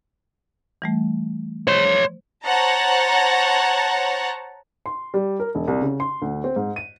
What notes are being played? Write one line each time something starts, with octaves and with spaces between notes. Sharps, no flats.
E3 G3 A3
F3 C5 C#5 C6
C5 C#5 F#5 A5 A#5
C6
G3
A#4
E1
C2
C#3
C6
D2
C4
G#2
D#7